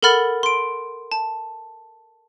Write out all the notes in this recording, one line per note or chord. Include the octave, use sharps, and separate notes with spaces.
A4 A#4 F#5 B5 F6 A6
C6 D7
A5